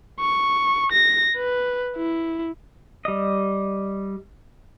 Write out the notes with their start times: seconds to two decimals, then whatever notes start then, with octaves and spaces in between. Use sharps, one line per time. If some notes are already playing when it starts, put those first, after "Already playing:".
0.20 C#6
0.92 A#6
1.37 B4
1.96 E4
3.05 G3 D#5